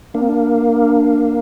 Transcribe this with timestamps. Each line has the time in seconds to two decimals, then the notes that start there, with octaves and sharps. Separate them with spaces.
0.14 A#3 D4
0.21 C4
0.29 D4